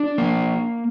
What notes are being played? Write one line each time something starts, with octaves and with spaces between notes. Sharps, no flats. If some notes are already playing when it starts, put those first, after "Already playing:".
Already playing: D4
A#3